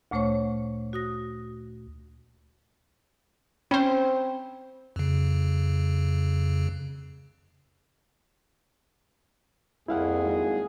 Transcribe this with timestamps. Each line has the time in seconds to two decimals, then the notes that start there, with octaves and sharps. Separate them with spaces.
0.11 D2 A#2 A3 C5 C#5 C#6
0.93 F#4 D#6 A#6
3.71 C4 C#4 C5 G5 B5
4.96 F2 C#3
9.88 C2 F2 A#3 E4 G#4 F5 F#5
10.24 G#1